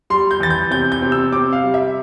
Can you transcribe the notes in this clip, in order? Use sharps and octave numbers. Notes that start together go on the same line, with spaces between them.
G3 C6
G6
E3 A6
G6
C3 G6
G6
C3
E6
C3 D6
F5
G3
E5